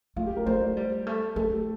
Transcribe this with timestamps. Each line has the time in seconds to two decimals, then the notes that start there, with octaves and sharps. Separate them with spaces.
0.16 A3 F4
0.26 G4
0.36 A#4
0.46 A3 C5
0.62 D5
0.77 G3 C5
1.07 A3
1.36 A3 A4
1.52 G4